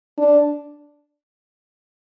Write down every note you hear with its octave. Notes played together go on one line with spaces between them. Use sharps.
D4